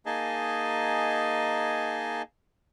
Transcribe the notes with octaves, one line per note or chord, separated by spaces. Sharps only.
A#3 D#4 G#4 D#5 G#5 A5